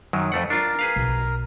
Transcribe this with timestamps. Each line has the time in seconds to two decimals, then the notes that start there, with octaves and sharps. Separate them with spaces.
0.13 F#2 D#3 F#3
0.32 F2 A3 F#5
0.50 D4 F4 A#4
0.79 G#4 B4 F5
0.96 B1